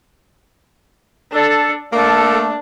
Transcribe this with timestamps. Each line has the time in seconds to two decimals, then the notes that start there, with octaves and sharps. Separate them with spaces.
1.32 D4 A4
1.93 A3 A#3 D4 A4